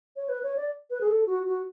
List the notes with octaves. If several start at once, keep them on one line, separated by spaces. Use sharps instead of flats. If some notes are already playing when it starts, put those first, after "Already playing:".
C#5
B4
C#5
D5
B4
G#4
A4
F#4
F#4